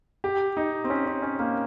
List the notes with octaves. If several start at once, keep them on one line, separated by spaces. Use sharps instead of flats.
G4
D#4
C4
C#4
C#4
C#4
A#3